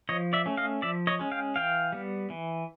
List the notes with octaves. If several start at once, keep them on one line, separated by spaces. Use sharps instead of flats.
F3 C#5 D#5
D5 E5
A3 C#4
D#5 F5
F3 D5 E5
C#5 D#5
G#3 C#4
F5 G5
E3 F5 G5
G3 B3
E3